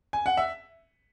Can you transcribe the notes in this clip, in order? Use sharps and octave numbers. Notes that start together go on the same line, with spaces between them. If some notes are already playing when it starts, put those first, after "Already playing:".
G#5
F#5
E5